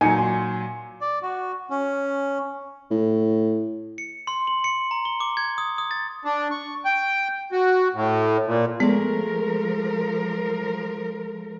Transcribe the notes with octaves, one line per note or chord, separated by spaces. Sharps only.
A#2 F#3 D#4 G#5 C#7
C6
D5
F#4
C#4
A2
C#7
C6
F#7
C#7
A#5
G7
D6
G#6
D#6
D#6
A6
D4
C#6
G5
F#4
A2
A#2
F3 G#3 A3 B3 A#4